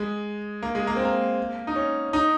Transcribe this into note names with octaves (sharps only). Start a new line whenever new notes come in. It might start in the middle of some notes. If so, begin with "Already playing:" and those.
Already playing: G#3
A#3
G#3
A#3
C4
A#3
D#4
C#4
D#4